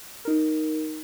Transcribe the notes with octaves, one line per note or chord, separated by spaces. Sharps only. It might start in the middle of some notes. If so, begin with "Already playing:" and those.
D#4 A#4